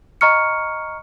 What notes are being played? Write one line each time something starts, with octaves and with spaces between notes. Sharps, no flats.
D#5 A#5 C#6 F6 C#7